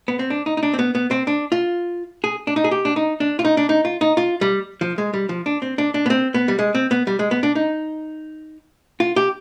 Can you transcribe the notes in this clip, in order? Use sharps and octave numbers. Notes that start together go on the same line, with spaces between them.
B3
C4
D4
D#4
D#4
D4
C4
B3
B3
C4
D4
F4
G#4
D4
D#4
G#4
G4
D4
D#4
D4
F4
D#4
D4
D#4
F4
D#4
F4
G3
F3
G#3
G3
F3
D4
C4
D4
D4
B3
C4
B3
G3
G#3
C4
B3
G3
G#3
B3
D4
D#4
F4
G4